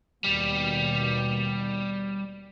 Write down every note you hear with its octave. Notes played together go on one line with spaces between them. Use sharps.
D#2 B2 G3